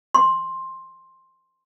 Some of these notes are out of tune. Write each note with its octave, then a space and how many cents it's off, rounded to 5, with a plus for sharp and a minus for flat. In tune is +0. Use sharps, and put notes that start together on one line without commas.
C6 +10